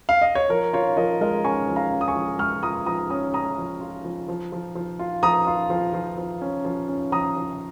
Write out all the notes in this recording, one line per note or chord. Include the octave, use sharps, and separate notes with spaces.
F5
D#5
C#5
F3 A#4
F4 C#5
F3 A#4 D#5
G#3 A#4 D#5
C#4 G#5 C#6
F3
F5 A#5
C#4
D#6
G#5 C#6
F3
G#3 C#6 F6
F4 A#5 D#6
F3 A#5 D#6
C#4 A#5 D#6
C#4 A#5 D#6
F3
F4
F3
F3
F3
F3
F4
F3 A#5 D#6
F4
F3
F3
F3
C#4
F3
C#4
F3 A#5 D#6
F3